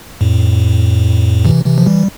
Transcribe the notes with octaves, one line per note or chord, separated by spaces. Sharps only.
F2 A2
C3 E3
C3 E3
F3
E3 G3